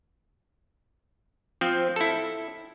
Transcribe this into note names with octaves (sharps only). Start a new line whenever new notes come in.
F3 C4
E4 A4